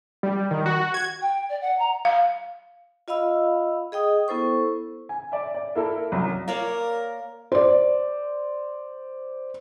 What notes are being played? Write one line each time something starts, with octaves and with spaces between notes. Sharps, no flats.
G3
D#3
F#4
G#6
G5
D5
F#5
A#5
F5
F4 D#5 F5 B5 E6
G#4 D#5 G5 D#6
B3 E4 A4 C5 C#6
G#5
D5 E5
D5
A#3 E4 A4 A#4
C2 F#2 F#3
A#3 A#4 C#5 D5
C5 D5